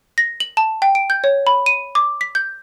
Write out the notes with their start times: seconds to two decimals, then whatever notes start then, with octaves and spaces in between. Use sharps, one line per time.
0.18 A#6
0.40 F#7
0.57 A5
0.82 G5
0.95 D7
1.10 G6
1.24 C#5
1.47 B5
1.66 D#7
1.95 D6
2.21 B6
2.35 G6